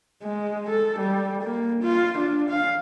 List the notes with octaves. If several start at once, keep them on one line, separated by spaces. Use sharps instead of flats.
G#3
A4
G3
A#3
F4
D4
F5